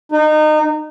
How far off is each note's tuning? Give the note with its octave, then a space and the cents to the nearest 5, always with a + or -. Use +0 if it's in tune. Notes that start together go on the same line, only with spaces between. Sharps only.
D#4 -25